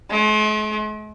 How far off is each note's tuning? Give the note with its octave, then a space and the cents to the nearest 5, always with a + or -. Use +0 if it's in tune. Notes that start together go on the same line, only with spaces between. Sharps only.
G#3 +45